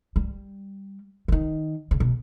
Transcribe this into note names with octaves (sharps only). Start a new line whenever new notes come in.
G3
C#3
D#3
C#3
B2